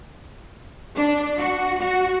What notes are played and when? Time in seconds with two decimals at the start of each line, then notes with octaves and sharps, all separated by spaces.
0.96 D4
1.38 F#4
1.81 F#4